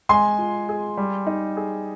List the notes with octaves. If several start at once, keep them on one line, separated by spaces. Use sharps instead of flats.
G#3 G#5 C6
F4
G#4
G3
D#4
G#4